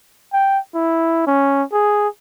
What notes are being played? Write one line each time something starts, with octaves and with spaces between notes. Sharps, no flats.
G5
E4
C#4
G#4